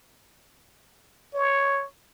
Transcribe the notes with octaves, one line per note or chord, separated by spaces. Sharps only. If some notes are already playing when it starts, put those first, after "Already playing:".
C#5